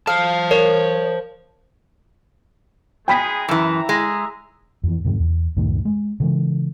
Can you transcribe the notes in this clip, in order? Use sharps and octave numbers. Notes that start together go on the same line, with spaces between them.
C5 F5 A5
A#4 C#5
G#3 D#4 G#4 G5 B5 B6
F#2 E3 E4 E5 A#5
G#3
F2 E3
F2 G#2 C3 D#3
E2
C#2 F#2 A2 D#3
G#3
C#3 E3 G#3